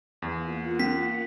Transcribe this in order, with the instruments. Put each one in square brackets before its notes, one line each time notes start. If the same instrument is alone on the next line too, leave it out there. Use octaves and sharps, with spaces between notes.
[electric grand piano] E2 [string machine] A#3 F4 F#5
[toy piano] C#4 [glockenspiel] B6